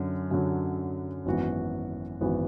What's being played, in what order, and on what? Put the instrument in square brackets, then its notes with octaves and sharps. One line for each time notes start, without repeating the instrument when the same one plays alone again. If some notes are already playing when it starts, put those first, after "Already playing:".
Already playing: [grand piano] F#2 D3 F#3
F#2 D3 F#3
G#1 F#2 E3 B3 F#4
G#1 F#2 E3 B3 F#4